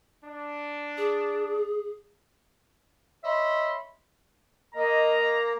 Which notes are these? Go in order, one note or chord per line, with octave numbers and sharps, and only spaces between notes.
D4
G#4
C#5 D#5 E5 B5 C6
A#3 D#5 A#5